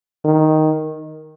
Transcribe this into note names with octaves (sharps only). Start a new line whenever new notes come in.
D#3